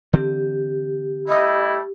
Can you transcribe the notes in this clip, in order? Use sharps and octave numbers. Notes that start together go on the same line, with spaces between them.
D3 E3 C4 G4
G3 A3 E4 D#5